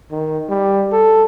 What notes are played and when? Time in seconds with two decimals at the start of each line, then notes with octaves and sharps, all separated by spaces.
0.11 D#3
0.49 G3
0.92 A4